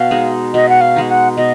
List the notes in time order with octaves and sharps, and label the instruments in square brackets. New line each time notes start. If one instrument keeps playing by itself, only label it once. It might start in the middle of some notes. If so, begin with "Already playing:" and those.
Already playing: [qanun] B2 [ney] F5
[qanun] G#3 D#4
[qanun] B2 [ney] D#5
[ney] F#5
F5
[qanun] G#3 D#4
[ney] F#5
[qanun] B2 [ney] D#5